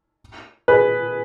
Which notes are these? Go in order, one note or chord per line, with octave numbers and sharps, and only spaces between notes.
G#4 B4